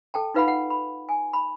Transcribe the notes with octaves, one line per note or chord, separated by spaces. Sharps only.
A4 G5 A5
D#4 F4 B4 F5 F#5 B5
F#5
B5
G#5
B5